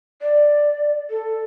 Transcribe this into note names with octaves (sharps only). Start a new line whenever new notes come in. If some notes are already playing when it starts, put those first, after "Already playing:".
D5
A4